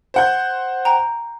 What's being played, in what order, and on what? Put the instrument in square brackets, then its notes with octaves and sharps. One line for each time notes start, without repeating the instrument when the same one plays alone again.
[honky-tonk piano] C5 F#5 G6
[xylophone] G5 A#5